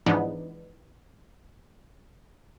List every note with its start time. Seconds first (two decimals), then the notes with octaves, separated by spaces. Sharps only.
0.06 G#2 E3 F3 B3 D4 D#4